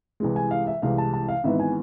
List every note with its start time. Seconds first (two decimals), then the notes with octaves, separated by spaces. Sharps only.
0.20 C2 C3 E3 G#3
0.36 G#5
0.51 F5
0.67 E5
0.82 C2 C3 E3 G#3 F5
0.98 A5
1.13 A5
1.28 F5
1.44 G#1 G#2 E3 B3 E5
1.59 G#5